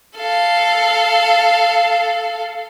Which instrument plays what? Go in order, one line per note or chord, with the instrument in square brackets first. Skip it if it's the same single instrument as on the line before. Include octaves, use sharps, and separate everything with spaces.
[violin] A4 F5